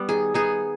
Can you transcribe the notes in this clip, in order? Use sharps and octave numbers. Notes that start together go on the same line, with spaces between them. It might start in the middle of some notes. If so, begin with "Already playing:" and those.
Already playing: G3 B3
D#3 G#4
B3 D#4 G#4